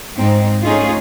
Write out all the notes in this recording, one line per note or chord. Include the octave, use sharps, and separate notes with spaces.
G#2 G#3 C4 D#4
A3 C#4 D#4 F4 G#4